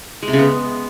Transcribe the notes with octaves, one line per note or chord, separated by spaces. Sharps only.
G#3
C3
C#3
B3